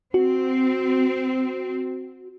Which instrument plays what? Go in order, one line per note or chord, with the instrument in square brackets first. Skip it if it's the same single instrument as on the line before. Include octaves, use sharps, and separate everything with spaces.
[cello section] C4 [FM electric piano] F#4